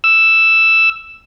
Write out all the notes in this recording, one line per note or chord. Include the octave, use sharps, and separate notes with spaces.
E6